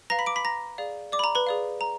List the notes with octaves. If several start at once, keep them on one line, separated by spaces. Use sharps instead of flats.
B4 F5 A#5 A#6
B5 B6
D6 D7
B5 B6
A#5 A#6
G#4 D5 F5
D5 D6
B5
A#5
B4 B5
G#4 D5 F5
A#5